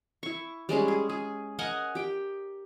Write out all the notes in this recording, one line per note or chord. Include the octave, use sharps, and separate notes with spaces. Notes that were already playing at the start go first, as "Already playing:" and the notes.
E4 C#6
G3 G#3 C#4 G#4
G#4
G#4
A#4 D#5 F#5 G#5
G4 G5